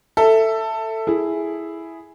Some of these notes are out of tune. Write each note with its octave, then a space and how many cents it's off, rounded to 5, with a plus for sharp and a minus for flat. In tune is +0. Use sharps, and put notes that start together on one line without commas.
A4 +15 E5 +0
E4 +0 G#4 +0